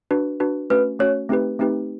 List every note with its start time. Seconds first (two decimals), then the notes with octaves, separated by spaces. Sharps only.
0.11 D4 F#4 B4
0.40 D4 F#4 B4
0.70 A3 C#4 F#4 B4
0.99 A3 C#4 F#4 C#5
1.29 A3 C4 D#4 G4 B4
1.59 A3 C4 D#4 G4 B4